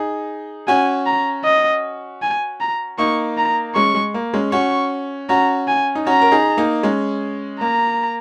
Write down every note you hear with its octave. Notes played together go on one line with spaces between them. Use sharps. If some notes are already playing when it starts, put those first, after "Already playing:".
Already playing: D#4 G#4
C#4 F#4 G#5
A#5
D#5
G#5
A#5
A#3 D#4 C#6
A#5
G#3 C#4 C#6
G#3
A#3
G#3 C#4
C#4 F#4 C#6
C#4 F#4 A#5
G#5
D#4
C#4 F#4 A#5
A#4
D#4 G#4
A#3 D#4
G#3 C#4
A#3 A#5